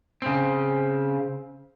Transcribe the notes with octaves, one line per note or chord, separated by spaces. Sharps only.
C#3 C4